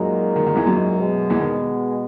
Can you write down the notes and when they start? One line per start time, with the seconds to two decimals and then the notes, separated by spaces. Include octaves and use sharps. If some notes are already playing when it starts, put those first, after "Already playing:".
Already playing: F#2 A#2 F#3 G#3 D#4 F#4 A#4
0.36 D#3
0.46 D#3
0.56 E2 E3
0.67 F#2 F#3
0.99 B2 G#3 B3
1.30 E2 E3
1.40 D#3